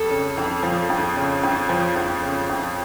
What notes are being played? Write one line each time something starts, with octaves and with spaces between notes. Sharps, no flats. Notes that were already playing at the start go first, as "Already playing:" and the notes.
Already playing: F2 A4
C#3
F2
F3
F2
C#3
F2
F3
F2
C#3
F2